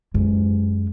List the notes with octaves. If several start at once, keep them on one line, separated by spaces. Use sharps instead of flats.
F#2 G#3